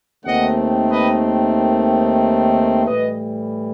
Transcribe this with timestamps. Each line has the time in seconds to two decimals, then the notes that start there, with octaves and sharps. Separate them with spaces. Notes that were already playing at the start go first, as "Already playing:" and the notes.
0.25 D#2 D#3 A3 C4 D#5 F#5
0.90 B4 D#5
2.86 A2 E3 G3 B4 D#5